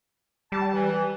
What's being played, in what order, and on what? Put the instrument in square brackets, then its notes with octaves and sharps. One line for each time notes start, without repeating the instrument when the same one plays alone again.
[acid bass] G3 [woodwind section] A5
[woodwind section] E3